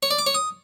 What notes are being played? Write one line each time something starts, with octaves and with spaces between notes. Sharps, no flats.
C#5
D5
D6
C#5
D#6